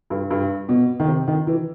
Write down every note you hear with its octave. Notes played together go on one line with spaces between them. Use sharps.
G2
G2
B2
D#3
C3
D#3
E3